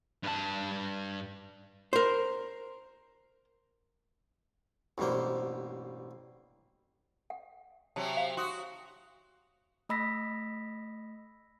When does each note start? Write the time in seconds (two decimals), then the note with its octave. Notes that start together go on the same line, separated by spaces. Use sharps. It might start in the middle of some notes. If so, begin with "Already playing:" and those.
0.24 G2 A5
1.93 A#4 C5
4.98 A1 G2 B2 A#3 C5
7.30 F#5
7.96 C3 F#3 A5
8.17 F5
8.37 F#4 C6 D#6
9.89 A3 D#5 B5 E6 A#6 B6